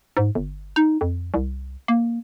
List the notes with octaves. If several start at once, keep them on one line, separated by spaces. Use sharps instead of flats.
G#2
G1
D#4
F2
C2
A#3